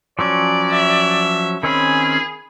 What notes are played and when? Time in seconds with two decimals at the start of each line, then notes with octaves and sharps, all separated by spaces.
0.19 F3 F#3 C#4 D5
0.71 E5
1.63 D#3 C4 C#4 G#4 B5